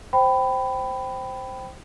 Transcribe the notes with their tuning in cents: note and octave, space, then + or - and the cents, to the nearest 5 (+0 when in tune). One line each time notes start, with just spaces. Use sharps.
C5 +0 G5 -10 B5 +15